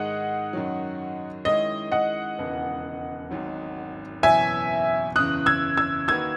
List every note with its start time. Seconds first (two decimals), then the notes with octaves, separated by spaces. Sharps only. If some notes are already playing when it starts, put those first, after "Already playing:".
Already playing: G#2 D#3 G#3 D#4 G#4 D#5 F#5
0.53 F#2 D#3 F#3
1.45 D#3 G#3 C#4 E4 D#5
1.91 D#5 F#5
2.38 E1 D#2 C#3 E3 B3
3.31 G#1 G#2 F#3
4.23 F#1 E2 B2 F#3 E5 G#5
5.15 F#1 E2 C#3 D#6 F#6
5.46 E6 G#6
5.77 E6 G#6
6.08 D#3 A#3 D#4 F#4 B4 E6 G#6